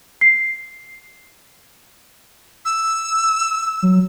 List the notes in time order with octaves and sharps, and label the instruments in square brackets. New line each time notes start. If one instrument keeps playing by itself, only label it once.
[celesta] C7
[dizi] E6
[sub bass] F#3